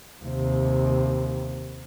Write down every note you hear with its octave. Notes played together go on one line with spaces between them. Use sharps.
D#2 C3